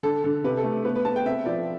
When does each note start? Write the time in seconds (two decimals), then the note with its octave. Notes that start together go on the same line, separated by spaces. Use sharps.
0.03 D3 A4
0.24 D3 A4
0.44 C3 B4
0.57 A4
0.64 A3
0.84 B3 B4
0.95 B4
1.05 B3 A5
1.16 G5
1.26 C4 E5
1.46 F3 D5